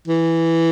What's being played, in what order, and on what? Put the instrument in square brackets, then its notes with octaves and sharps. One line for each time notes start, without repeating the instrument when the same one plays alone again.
[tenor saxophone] E3